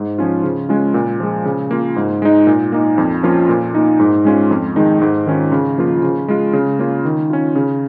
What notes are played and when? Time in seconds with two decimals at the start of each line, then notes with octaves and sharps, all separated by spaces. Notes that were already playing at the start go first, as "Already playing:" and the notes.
Already playing: G#2
0.18 F3 C#4 F4
0.44 C#3
0.69 G#3 C#4 F4
0.94 A#2
1.20 F3 G#3
1.45 C#3
1.71 A#3 F4
1.96 G#2
2.22 G#3 D#4
2.47 A#2
2.72 A#3 D#4
2.98 F2
3.23 F3 A#3 C#4 F4
3.49 A#2
3.75 A#3 D#4
4.00 G#2
4.25 G#3 C#4 F4
4.51 F2
4.76 D#3 G#3 D#4
5.02 G#2
5.27 D#3 C#4 F4
5.52 C#3
5.78 F3 A#3 F4
6.03 C#3
6.28 G#3 F4
6.53 C#3
6.79 A#3 C#4 F4
7.05 D#3
7.30 C#4 F4
7.55 C#3